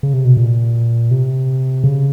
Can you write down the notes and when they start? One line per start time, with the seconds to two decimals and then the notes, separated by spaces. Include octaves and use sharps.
0.03 C#3
0.14 C3
0.25 B2
0.37 A#2
1.11 C3
1.84 C#3